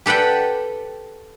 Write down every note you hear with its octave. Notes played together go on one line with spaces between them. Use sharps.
G4 A4 B4 F#5 G5